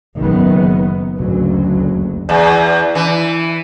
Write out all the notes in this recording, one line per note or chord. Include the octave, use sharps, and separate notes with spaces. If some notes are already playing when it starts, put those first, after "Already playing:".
F#1 D#3 B3
F#1 D2 F#3
E2
E3